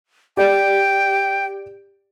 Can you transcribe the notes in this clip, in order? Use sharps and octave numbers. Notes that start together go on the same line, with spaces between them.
G4 D5 G5